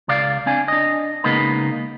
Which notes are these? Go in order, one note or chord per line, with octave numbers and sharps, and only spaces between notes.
C#2 C#3 D5 F5
C4 D4 G#5
D4 D#5
C#3 G#3 A#3 B3 D#4 B4